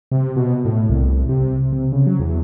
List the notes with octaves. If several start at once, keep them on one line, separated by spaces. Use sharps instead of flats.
C3
B2
A2
C2
C3
C3
C#3
F#3
E2